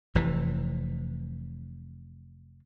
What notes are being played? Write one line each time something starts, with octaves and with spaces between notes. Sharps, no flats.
F1 C3 E3